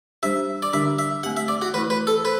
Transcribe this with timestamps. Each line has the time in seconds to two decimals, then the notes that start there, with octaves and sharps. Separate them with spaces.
0.23 G3 D4 G4 C5 E5
0.62 D5
0.73 D3 G3 D4 G4 E5
0.99 E5
1.23 A3 C4 G4 F#5
1.37 E5
1.48 D5
1.62 F#4
1.73 E3 A3 E4 B4
1.90 B4
2.07 A4
2.24 B4 C5